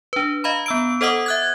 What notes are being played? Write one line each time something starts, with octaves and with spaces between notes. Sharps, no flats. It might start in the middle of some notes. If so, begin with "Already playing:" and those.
D4 B4
D#5 F5 A#5 B5
B3 E6 D7
A4 C5 D#5 F#5 D6 D#6
E5 F#6 G#6